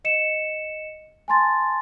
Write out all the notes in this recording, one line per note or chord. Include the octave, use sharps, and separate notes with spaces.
D#5 C#7 E7
G#5 A5 C6 A6